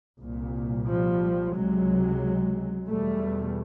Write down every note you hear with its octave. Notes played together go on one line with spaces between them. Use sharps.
C2 A#2
F3 G3
C#2 C3 F#3 G#3
E2 B2 G3 A3